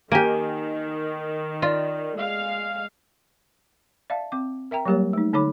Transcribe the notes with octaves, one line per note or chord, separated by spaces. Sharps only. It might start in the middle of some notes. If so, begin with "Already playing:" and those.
D#3 A#3 G4 A#4 G#5 D7
F4 D5 D#5
G#3 F5
D5 E5 F5 A5
C4 D6
A#4 E5 G5 A#5
F#3 G3 A#3 G4 A#4 C#5
A3 D#4
D3 D#4 A4 C#5 B5 D6